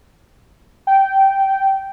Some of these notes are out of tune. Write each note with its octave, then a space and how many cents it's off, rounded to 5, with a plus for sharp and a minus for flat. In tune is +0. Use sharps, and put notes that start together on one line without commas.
G5 -10